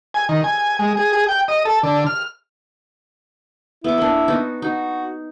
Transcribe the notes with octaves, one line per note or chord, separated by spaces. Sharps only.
G#5
D#3
G#5
G#3
G#4
G#4
G5
D#5
A4
D3
F6
B3 E4 D6
A#3 D4
B3 D#4 F#4
D#4 F#4